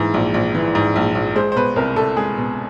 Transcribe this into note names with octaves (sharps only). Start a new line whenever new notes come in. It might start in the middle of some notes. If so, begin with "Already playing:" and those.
Already playing: G#2 E3
A#1
A#1
E3
G#2
A#1
A#1
G#3 C5
C5
B2 B4
C2 A#4
C2 A4
G#3 G#4
B2